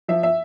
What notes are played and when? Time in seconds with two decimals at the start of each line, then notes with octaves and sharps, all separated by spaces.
0.08 F3 E5
0.23 E5